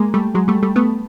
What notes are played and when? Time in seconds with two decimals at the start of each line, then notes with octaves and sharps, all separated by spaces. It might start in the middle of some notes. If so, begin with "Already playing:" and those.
Already playing: G#3 A#3
0.14 G3 A3
0.35 F#3 G#3
0.48 G3 A3
0.63 G3 A3
0.76 A3 B3